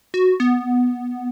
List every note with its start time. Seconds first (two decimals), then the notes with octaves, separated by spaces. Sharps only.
0.14 F#4
0.40 B3